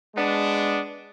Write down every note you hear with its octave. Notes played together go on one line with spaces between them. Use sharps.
G#3 B3 D4